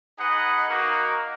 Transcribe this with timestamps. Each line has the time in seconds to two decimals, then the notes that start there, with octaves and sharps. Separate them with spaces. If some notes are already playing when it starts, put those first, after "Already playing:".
0.18 D#4 G#4 B4 D#5 F#5
0.68 A#3 D#4 F#4 A#4